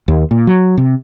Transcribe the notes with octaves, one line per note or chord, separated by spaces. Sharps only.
D#2
A#2
F#3
C3